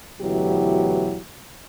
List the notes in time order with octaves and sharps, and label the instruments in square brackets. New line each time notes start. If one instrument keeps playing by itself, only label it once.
[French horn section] D2 B2 E3 F#3 E4 G4